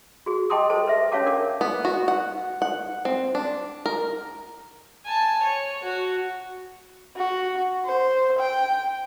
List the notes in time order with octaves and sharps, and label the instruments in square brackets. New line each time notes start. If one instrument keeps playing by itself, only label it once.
[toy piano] F#4 G#4
D#5 G5 A5 C6 D6 D#6
A4 C5 A5
B4 E5
C#4 C#5 F5 A5 D6
D4 A#4 D6
[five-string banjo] B3
F#4
F#5
F#5
C4
D4
A#4
[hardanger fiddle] G#5 A5
C#5
F#4
[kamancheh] F#4
C5
G5